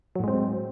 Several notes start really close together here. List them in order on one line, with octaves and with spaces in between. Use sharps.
F#3 A2 G#3 C4